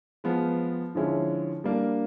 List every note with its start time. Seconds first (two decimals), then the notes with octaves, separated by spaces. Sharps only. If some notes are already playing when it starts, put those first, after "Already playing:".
0.24 F3 G#3 B3
0.95 D3 F3 G#3 C#4 E4
1.64 G3 A#3 D4